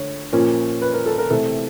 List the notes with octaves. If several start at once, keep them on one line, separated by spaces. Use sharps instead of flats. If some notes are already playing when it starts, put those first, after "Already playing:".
Already playing: D3 A3 C#5
A#2 F3 A#3 C#4
B4
A#4
A4
A#4
C3 E3 A3 A4